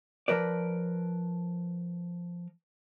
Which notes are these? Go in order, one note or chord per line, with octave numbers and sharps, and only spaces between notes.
F3 A#4 B4 D5